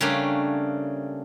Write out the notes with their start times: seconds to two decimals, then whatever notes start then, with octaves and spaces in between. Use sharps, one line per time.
0.01 C#3 G3 A3 A#3 C#4 D4